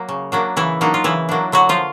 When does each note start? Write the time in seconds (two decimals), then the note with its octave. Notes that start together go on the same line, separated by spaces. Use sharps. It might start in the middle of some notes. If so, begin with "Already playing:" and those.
Already playing: F#3 A#3
0.09 C#3
0.32 F#3 A#3 D4
0.56 C#3 E3 E4
0.81 F#3 A#3 D4 D#4
0.94 F4
1.04 C#3 E3 E4
1.29 F#3 A#3 D4
1.52 D3 F#3 F#4
1.69 F3 F4